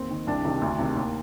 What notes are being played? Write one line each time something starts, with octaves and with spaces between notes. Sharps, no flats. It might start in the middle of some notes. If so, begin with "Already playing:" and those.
Already playing: D#2 C4
D#3
C2 D4
C3 D#3
D2
C3 D#3
D#2